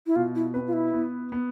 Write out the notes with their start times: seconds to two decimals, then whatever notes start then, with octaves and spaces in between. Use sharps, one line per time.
0.07 E4
0.16 B2 F4
0.35 E4
0.54 C4 B4
0.67 F4
0.73 E4
0.93 B3
1.32 B3